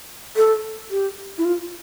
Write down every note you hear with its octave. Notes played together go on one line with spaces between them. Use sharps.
A4
G4
E4
F4